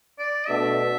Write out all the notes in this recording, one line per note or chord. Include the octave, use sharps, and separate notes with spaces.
D5
B2 A3 D4 F#4 E5